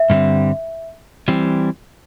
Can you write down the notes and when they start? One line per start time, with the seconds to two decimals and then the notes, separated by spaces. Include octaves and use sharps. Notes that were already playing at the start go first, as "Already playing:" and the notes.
Already playing: E5
0.10 G2 D3 G3 C4
1.28 E3 G3 C4